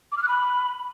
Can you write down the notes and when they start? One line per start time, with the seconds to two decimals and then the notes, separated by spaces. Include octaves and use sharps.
0.12 D6
0.17 F6
0.23 F#6
0.28 B5